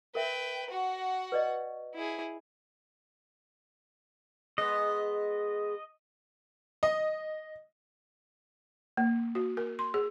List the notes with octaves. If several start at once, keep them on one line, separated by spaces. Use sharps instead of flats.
A#4 B4 E5 G5
F#4 F#5
B4 D5 D#5
E4 G#4
G#3 B3 D#5
D#5
A#3
F#4
A#4
C6
G#4